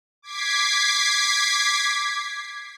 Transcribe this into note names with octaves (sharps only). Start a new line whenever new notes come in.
D6 G#6 B6 C7